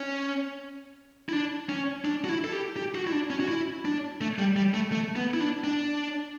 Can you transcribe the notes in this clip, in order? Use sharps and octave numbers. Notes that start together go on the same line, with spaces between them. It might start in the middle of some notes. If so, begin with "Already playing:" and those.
Already playing: C#4
E4
D4
C#4
D4
F#4
E4
A4
G4
G4
F#4
E4
D4
C#4
F#4
E4
D4
A3
G3
G3
A3
A3
B3
E4
D4
D4